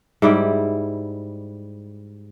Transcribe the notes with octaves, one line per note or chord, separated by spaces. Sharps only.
G#2 G3 E4 G5